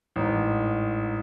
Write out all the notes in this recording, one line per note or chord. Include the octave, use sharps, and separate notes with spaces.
A1 G#2